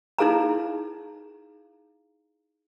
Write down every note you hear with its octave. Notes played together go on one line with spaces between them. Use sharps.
D#4 E4 G#4 F5 A#5